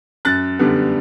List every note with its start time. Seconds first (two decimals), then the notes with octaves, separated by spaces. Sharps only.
0.25 F#2 F#6 A6
0.59 D3 G3 B3